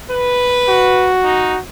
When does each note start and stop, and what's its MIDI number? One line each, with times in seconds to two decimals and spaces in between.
0.11 1.12 71
0.69 1.60 66
1.24 1.58 63